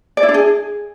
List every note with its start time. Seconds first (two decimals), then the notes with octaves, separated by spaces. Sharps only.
0.17 D5
0.23 E4
0.29 D4
0.34 G#4